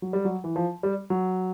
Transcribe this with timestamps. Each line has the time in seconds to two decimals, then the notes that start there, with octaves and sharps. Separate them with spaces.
0.02 F#3
0.13 G3
0.25 F#3
0.44 E3
0.56 F3
0.83 G3
1.10 F#3